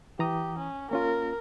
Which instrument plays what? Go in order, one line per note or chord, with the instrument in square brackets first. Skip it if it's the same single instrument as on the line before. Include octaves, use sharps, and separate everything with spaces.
[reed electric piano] E3 A#5 D#6 [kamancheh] G4
[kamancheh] C#4
[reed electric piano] A#3 C#4 F4 [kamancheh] A#4